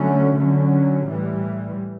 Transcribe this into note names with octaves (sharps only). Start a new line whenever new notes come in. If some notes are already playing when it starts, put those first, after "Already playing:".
Already playing: D3 F#3 A3 C#4
D3 F#3 C#4
A2 E3 G3